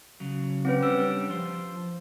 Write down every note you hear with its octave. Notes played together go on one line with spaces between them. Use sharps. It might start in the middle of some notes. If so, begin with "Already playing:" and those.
C#3 F#3
C4 C#4 B4
G3 D4 G4 E6
F3 C5